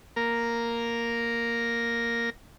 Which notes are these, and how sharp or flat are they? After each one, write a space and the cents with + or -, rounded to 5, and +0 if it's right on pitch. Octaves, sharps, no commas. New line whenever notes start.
A#3 +0 A#4 +0